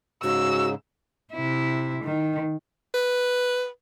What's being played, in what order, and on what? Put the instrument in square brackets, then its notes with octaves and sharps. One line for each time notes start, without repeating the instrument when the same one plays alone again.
[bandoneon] G#2 C#3 [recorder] F#4 [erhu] E6
[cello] C3 E4
D#3
[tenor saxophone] B4